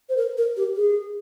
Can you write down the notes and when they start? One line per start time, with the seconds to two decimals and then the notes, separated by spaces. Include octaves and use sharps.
0.09 C5
0.17 A#4
0.38 A#4
0.57 G4
0.76 G#4